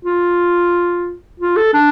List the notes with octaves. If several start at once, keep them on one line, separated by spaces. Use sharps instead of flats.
F4
F4
A4
D4